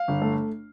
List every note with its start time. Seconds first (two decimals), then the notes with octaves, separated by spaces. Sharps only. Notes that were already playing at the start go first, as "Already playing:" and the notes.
Already playing: F5
0.08 G1
0.22 A3